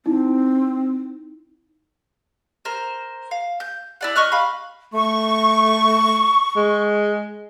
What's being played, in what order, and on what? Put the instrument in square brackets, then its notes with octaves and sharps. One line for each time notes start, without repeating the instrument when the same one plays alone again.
[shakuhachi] C4 [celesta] D#4 E4
[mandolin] A#4 C5
F5
G6
E4 D5 F#5
D#5 C#6 F6 F#6
F5 B5
[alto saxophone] A3 [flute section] C#6
[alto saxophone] G#3